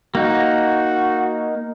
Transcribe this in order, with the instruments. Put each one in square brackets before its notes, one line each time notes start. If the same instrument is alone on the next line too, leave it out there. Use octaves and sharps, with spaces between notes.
[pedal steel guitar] A#3 D#4 [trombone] F#4